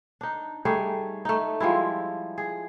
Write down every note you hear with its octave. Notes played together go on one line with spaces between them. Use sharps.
D4 D#4
G3 A3 D#4 G#4
A3 D#4
F3 G3 G#3 E4
G#4